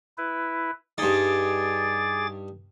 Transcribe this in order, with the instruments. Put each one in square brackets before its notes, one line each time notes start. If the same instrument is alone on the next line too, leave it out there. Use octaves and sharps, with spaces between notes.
[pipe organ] E4 B4
[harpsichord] G2 D#4 [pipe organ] G#4 D6 A6